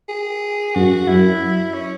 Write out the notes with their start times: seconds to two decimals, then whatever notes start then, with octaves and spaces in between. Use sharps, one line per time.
0.09 G#4
0.75 F#2 F#4
1.07 F#2 E4
1.74 C#4